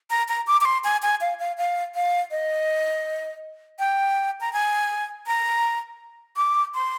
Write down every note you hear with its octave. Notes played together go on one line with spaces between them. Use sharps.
A#5
A#5
D6
D6
C6
G#5
G#5
F5
F5
F5
F5
D#5
G5
A#5
G#5
A#5
D6
C6